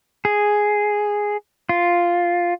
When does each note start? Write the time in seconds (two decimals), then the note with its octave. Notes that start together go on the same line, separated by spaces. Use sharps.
0.25 G#4
1.69 F4